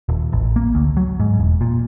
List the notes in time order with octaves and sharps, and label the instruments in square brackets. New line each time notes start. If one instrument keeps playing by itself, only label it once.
[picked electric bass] D#1
A1
A#3
D2
F#3
G#2
E1
A#2